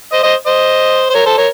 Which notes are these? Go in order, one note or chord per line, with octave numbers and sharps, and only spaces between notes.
C5 D#5
C5 D#5
C5 D#5
C5
A#4 C#5
A4 C5
A#4 C#5